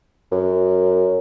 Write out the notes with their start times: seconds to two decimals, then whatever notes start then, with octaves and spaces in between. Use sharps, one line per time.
0.32 F#2